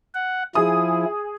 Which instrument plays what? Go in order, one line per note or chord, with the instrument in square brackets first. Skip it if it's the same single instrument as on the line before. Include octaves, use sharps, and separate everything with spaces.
[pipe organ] F#5
[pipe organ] F3 E4 [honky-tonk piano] G#4 G#5 D#6